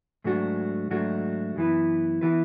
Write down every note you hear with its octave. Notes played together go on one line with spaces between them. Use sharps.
G#2 F#3 A3 D4 F#4
G#2 F#3 A3 D4 F#4
F#2 E3 B3 E4 B4
E3 B3 E4 B4